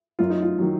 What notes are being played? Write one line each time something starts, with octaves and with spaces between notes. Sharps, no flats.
F#2 F4
D#4
F4
D#3 F#3